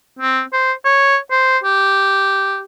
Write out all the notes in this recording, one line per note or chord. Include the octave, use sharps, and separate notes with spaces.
C4
C5
C#5
C5
G4